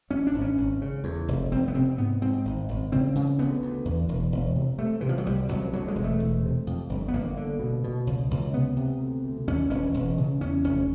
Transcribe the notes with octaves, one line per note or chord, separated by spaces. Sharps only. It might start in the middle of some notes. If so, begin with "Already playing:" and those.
F#2 C#4
D4
G#1
C#4
G#1
C#3
E2
F1
F1 C4
B3
C3 C4
G#2 B3
G#2 C4
G#1
G#1
C#3 C4
C#3
D2 B3
D2
E2
E1
E1
C3
C3 A3
C3 E3
F3
F#3
C2 G3
C2 F#3
D2 F#3
G#3
E1
A3
E1
C3
F2
G1
B3
G1 A#3
D3
B2
B2
C#2
C#2
C3 B3
C3
D2
D2
D#2 C#4
E1 C#4
E1
C#3
E2 C#4
F1 C#4